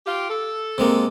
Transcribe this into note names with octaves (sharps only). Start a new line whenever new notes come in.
F4 G4
A4
C3 G#3 A#3